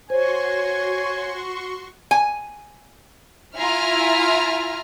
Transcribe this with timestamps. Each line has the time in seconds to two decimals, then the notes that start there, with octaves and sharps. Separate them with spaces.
0.10 F#4 C5 C#5 G#5 C6 C#6
2.11 G#5
3.57 E4 F4 E5 G#5 A#5 F6